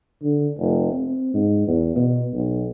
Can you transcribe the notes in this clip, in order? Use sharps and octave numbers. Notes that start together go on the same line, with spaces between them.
D3
F1
C4
G#2
E2
B2
B1